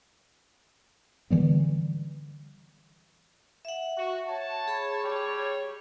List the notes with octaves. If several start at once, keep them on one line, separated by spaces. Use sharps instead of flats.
D3 E3 G3 B3
E5 F#5
F#4
C#5 A5
G#4 B5
G3 C#5